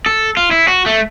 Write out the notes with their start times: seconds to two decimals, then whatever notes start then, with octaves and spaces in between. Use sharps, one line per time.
0.06 A4
0.37 F4
0.51 E4
0.68 F#4
0.86 A3